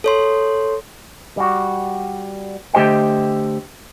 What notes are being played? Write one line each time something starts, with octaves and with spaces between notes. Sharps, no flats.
A4 C#5 C6
G3 F#4
D3 A3 G4 C5 D#5 G5